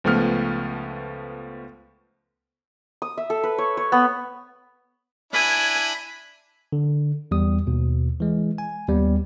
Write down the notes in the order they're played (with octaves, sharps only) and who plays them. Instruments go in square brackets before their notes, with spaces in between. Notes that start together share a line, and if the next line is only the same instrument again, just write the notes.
[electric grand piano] C#2 F3 A3 B3 F6
[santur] D#6
E5
A4
B4
C#5
C#5
B3
[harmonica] D4 E4 [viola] G#5 [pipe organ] B5
[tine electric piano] D3
E2 G3 D#6
D#2 B2
E3 G#3
G#5
D#2 G3 B3